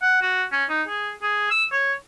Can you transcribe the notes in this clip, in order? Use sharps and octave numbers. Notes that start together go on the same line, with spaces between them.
F#5
F#4
C#4
D#4
G#4
G#4
E6
C#5